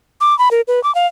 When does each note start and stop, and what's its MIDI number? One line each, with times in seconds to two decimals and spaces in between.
0.21 0.37 86
0.39 0.49 83
0.51 0.61 70
0.68 0.82 71
0.84 0.94 86
0.95 1.07 77